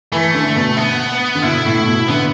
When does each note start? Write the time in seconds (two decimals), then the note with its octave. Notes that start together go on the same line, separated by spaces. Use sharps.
0.12 E3 A3
0.34 D3
0.56 B2
0.77 B3
1.35 D3
1.43 B2 E4
1.65 A2
1.87 B2
2.08 D3 B3